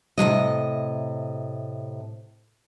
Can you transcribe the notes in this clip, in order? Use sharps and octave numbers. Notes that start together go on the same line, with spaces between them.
A2 C3 F#3 D#5